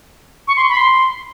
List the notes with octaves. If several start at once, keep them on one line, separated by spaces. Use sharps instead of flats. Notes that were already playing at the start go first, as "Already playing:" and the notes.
C#6
C6
B5
C6